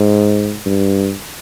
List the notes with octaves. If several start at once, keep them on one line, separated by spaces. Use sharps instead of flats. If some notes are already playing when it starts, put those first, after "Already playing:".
Already playing: G#2
G2